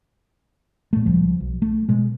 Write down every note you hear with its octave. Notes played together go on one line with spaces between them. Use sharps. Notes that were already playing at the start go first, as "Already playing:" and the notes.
A#2 A3
C#2 F3 G3
B1
A3
B2 G#3